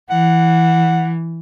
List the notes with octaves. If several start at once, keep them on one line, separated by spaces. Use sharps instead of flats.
E3 F#5